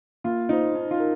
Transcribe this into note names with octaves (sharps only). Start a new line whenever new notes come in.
A#3 F4
D#4 F4 C5
D#4
F4
A#4